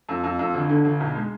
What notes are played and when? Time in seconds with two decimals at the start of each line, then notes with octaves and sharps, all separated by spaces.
0.09 F2
0.24 F2
0.39 F2
0.54 G1
0.69 D3
0.85 G1
1.00 B1
1.16 G#3